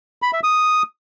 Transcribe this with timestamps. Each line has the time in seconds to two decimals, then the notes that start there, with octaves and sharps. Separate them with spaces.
0.22 B5
0.33 E5
0.43 D#6